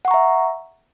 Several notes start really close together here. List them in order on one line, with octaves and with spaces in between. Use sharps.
F#5 C#6 A#5 E5